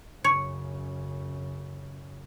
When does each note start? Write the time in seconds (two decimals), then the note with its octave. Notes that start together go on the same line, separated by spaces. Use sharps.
0.24 F#2 C#3 C#5